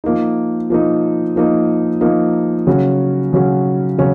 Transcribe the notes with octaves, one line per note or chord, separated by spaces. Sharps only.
F3 A#3 D#4
F3 A#3 D#4
F3 A#3 D#4
F3 A#3 D#4
C#3 F#3 C#4 F#4
C#3 F#3 C#4 F#4
C#3 F#3 C#4